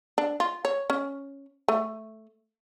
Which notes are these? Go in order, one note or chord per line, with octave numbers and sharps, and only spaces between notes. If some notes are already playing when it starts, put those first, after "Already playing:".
D4
F4
C#5
C#4
A3